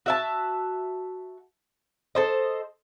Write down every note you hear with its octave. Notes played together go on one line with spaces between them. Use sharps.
F#4 E5 A5
A4 C5 D#5